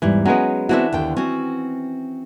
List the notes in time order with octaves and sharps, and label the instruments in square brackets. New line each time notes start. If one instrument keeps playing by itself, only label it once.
[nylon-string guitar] E2 G#2 G3 [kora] E3
[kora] F#3 G#3 B3 [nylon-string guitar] C#4
[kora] E3 D4 E5 [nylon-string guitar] B3 C4 F#4
[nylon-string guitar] D#2 D3 G5
[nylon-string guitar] C4 F#4 [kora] C#4